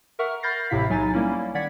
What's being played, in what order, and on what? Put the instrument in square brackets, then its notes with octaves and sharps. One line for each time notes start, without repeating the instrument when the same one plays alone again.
[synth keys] A#4 E5 F#5 C#6 F6
B5 F6 G6 A6 A#6 C7
A1 A2 C3 E4 F5 B6
B1 F#3 D#4 G#5 A6
G3 A#3 C#4 E4
D#3 D5 F#5 G#6 B6